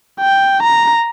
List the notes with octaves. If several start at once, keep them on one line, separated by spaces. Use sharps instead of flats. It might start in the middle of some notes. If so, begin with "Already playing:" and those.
G5
A#5